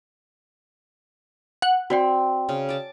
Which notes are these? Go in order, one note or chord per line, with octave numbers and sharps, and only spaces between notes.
F#5
C4 F#4 D5 G5
C#3
A5 D6